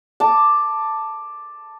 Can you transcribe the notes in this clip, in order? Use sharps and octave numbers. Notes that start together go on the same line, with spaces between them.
A5 D6